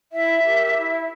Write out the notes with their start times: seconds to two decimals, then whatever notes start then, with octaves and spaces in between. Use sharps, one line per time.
0.12 E4 E5
0.44 G4 A#4
0.75 E4